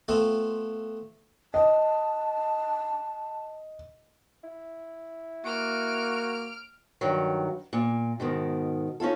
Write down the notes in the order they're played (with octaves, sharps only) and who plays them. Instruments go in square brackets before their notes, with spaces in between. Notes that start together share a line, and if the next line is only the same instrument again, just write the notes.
[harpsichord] A3 B3 C4 F4 A4 E5
[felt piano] D#5 [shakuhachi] A5
[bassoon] E4
[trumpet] A#3 [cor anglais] F#4 [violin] F6 D7
[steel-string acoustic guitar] G2 D#3 F#3
A#2
G#2 B2 D#3
C#4 D#4 F4 A4